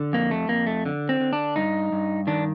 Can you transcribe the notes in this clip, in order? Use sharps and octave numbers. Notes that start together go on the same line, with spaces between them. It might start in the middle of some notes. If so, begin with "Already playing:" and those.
Already playing: D3
F2 A#3
A3
F2 A#3
A3
D3
C4
D3
D4
G2 D#4
G2
D#3 D4